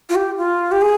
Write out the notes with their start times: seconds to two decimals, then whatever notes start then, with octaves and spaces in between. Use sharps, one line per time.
0.09 F4
0.15 G4
0.37 F4
0.71 G4
0.81 G#4